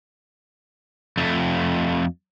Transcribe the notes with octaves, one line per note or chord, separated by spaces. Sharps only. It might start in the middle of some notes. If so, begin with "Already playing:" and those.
F2 A3